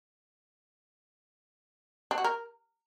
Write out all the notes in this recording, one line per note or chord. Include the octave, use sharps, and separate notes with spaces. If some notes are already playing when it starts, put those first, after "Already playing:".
D4
F#4
A#4